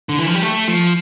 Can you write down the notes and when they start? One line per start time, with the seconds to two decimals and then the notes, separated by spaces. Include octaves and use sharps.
0.09 D3
0.18 E3
0.26 F3
0.34 G3
0.42 A3
0.68 F3